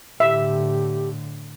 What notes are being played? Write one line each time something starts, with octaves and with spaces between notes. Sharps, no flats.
A2 D3 G4 E5